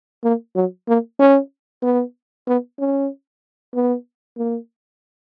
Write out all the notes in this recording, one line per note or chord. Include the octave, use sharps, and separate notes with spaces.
A#3
F#3
A#3
C#4
B3
B3
C#4
B3
A#3